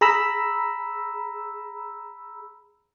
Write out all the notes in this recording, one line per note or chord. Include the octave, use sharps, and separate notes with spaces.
G#4 A#5 B5 E6